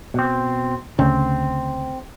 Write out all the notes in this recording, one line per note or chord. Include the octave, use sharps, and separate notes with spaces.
B2 C4
D2 C#3 C4